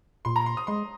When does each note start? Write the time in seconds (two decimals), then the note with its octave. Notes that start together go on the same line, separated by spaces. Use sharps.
0.25 A#2 C6
0.36 A#5
0.46 C6
0.57 D#6
0.67 G#3 C6